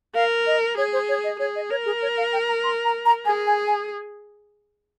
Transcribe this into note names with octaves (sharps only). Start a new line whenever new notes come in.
A#4 F5
D#5
G#4 C#5
C5
C#5
D#5
G#4 C#5
D#5
A#4 C#5
G#4
C#5
F5
G5
A#5
C6
A#5
A#5
G#4 G#5
G#5
G#5